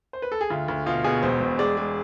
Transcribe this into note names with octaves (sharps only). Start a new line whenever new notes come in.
C5
B4
A4
G#4
D2 F4
D2
B2 F4
B2 G#4
E1 C5
E1
G#3 D5
G#3